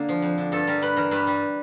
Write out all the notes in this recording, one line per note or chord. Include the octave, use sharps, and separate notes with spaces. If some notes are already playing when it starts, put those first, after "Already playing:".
Already playing: D3 A#3
F3
F2
D3
G2 A4
G3 A#4
G2 B4
E3 A#4
G2 B4
G3